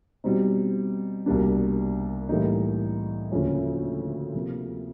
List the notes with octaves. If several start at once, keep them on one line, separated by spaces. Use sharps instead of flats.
B2 G3 C4 D#4
C2 B2 G3 A#3 D4
A2 E3 G3 A#3 D#4
D2 C#3 F3 A#3 C#4
C3 F3 A#3